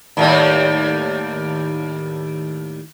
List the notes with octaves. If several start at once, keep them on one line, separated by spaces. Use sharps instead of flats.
D#2 A2 G3